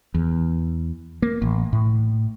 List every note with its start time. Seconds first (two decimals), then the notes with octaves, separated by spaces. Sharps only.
0.14 E2
1.22 A#3
1.42 A1
1.73 A2